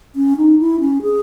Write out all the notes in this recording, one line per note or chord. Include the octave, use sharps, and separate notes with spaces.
C#4
D#4
E4
C#4
G#4